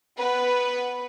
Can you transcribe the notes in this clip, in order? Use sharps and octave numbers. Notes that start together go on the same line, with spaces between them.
B3 B4